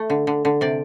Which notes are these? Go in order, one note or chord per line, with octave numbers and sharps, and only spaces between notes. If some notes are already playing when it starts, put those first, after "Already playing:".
Already playing: A3
D3
D3
D3
C3 D5